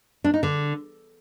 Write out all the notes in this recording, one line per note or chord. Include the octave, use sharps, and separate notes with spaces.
D4
D#4
D3